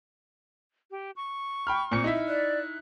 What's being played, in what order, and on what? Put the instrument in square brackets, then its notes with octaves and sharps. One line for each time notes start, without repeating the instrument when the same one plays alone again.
[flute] G4
C#6
[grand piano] G5 B5 F6
A#2 C4 C#7
D#4 E4 E5
[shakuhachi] D5 [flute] F#6